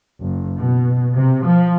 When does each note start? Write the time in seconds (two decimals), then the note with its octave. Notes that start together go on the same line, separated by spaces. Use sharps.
0.19 F#1
0.59 B2
1.16 C3
1.46 F3